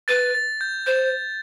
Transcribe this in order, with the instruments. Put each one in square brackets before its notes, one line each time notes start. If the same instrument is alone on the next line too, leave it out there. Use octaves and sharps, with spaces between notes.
[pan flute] B4 [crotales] A6
[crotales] A6
G6
[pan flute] C5 [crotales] G6